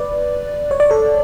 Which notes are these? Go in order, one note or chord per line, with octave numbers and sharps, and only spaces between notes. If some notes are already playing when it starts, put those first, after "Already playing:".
Already playing: B4 D5
C#5
D5
A4 C#5